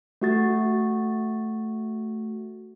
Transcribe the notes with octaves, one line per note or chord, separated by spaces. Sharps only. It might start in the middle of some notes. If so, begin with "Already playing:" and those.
A3 F#4 A6